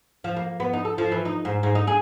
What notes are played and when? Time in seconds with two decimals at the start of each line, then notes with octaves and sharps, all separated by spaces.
0.24 F3
0.37 A#3
0.60 B3
0.73 D#4
0.85 A4
0.98 F3
1.12 E3
1.25 D#4
1.45 G#2
1.63 G#2
1.75 D#4
1.87 G#4